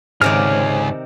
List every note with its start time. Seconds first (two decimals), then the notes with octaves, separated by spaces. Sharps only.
0.21 C#2 G#2 C3 D#3 G#4 C#5 D5 F6